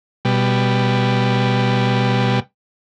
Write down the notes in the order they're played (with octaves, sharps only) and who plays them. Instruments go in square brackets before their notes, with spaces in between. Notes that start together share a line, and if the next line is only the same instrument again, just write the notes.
[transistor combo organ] B2 G3